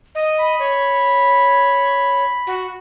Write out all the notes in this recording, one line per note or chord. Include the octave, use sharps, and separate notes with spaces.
D#5
B5
C#5
F#4